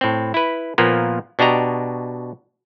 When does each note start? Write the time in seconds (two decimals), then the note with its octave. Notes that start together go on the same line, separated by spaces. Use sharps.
0.01 A2 C4
0.34 E4 B4
0.78 A#2 F3 A#3 B3
1.39 B2 D4 F#4 G4 D#5 A#5